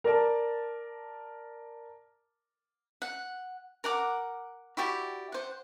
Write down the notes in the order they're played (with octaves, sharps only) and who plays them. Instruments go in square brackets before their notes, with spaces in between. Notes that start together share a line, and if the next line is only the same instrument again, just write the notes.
[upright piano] A#4 D5 A5
[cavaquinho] F#5
A#4 F#5 D6
E4 F#4 G4 D5
C5 F#5